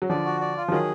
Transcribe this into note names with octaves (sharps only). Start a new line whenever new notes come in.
F#3
D3 F3 D5
F#4
D5
F4
F3
D#3 F#3 G#4